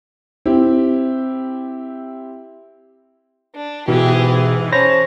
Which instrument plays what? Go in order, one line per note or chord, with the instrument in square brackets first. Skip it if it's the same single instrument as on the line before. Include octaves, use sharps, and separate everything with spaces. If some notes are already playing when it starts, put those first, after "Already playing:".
[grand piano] C4 E4 G4
[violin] D4
[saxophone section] G#2 E3 [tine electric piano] B2 [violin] G4 G#4
[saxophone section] C#4 C#5 [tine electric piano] C5 B5 A#6 [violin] A5